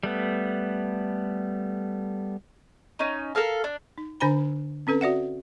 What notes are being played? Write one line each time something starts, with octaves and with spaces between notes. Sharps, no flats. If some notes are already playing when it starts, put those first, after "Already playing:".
G3 A3 B3
C#4 D#4
A4 A#4 F5 A5
D4
D#4
D3 D4 C5 G#5 A#5 B5
C4 C#4 A4 B4
F#4 D5 E5 F#5